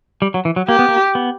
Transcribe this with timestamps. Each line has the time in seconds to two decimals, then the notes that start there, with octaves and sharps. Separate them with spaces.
0.22 G3
0.34 F#3
0.45 E3
0.56 F#3
0.68 A#3 G4
0.79 B3
0.88 A#3
1.15 B3